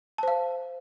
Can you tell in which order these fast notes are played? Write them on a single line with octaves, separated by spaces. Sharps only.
A5 C5 F5